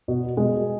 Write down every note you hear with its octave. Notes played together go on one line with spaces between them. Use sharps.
B2
B2 G#3